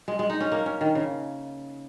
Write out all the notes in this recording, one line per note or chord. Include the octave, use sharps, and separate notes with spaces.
G#3
G#3
D#4
C#4
A#3
C#4
D#3
C#3